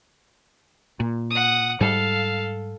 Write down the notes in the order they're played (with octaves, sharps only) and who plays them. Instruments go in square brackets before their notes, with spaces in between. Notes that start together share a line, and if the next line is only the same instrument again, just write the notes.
[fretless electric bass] A#2
[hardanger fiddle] F#5 D#6
[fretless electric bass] G#2 G3 [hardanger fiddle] A4 F5